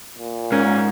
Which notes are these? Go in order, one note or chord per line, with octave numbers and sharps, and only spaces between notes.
A#2
G#2 C#4 A#4